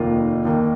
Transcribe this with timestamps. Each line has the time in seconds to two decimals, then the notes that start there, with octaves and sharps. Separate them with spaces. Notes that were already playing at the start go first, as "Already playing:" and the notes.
Already playing: F1 D#2 D#3 A#3 F4
0.45 D#2 D#3 A#3